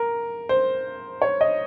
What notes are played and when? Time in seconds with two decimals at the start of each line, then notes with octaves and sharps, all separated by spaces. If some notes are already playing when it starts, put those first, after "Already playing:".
Already playing: A#4
0.49 C5
1.22 C#5
1.41 D#5